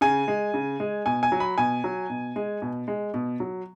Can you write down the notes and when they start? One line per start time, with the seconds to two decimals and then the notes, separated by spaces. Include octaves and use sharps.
0.01 C#3 G#5
0.28 G#3
0.54 C#3
0.80 G#3
1.06 B2 G#5
1.23 G#5
1.32 F#3
1.40 B5
1.58 B2 G#5
1.84 F#3
2.10 B2
2.36 G#3
2.62 B2
2.88 G#3
3.14 B2
3.40 F#3